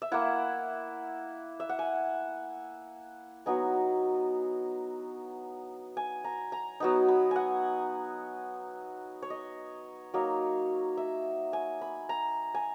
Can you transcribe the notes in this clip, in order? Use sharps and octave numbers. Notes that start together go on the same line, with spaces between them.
E5
A#3 E4 F#5
E5
F#5
G#5
F#3 B3 D#4 G#5
G#5
A#5
A#5
F#3 B3 D#4
B5
F#5 G#5
C#5
D#5
F#3 A#3 D#4 C#5
E5
G#5
B5
A#5
G#5